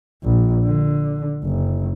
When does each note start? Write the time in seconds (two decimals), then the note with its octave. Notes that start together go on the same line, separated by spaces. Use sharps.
0.24 A#1
0.65 D3
1.44 F#1